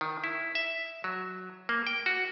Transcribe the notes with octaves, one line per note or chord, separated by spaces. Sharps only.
D#3
E4
E5
F#3
A#3
G5
F#4